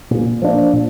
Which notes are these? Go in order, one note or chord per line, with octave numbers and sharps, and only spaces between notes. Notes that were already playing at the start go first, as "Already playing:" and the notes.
A#2
F3 A#3 D4
A#2